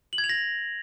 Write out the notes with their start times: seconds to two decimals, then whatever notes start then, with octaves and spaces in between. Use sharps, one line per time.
0.13 F#7
0.18 G#6
0.24 F7
0.29 A#6